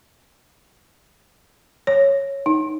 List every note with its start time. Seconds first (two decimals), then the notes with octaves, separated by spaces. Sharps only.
1.87 C#5
2.46 D#4